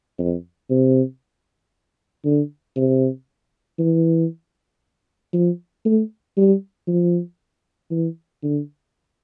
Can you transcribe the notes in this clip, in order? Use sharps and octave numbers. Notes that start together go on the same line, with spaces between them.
F2
C3
D3
C3
E3
F3
A3
G3
F3
E3
D3